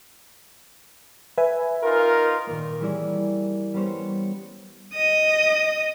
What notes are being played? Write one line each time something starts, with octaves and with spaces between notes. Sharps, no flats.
B4 E5 G#5
D#4 F4 A#4
A#2 D#3 A#3
E3 G3 C#4 E4 G#4 D5
G3 B3 C#4 C5 C#5
D#5 D#6